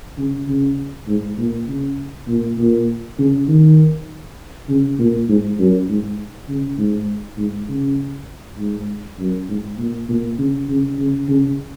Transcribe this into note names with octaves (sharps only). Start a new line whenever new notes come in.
C#3
C#3
G#2
A#2
C#3
A#2
A#2
C#3
D#3
C#3
A#2
G#2
F#2
G#2
C#3
G#2
G#2
C#3
G#2
F#2
G#2
A#2
A#2
C#3
C#3
C#3
C#3